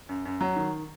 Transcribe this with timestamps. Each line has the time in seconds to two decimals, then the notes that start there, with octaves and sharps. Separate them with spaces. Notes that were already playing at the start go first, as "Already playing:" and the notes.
0.09 F#2
0.25 F#2
0.41 F#3
0.56 D#3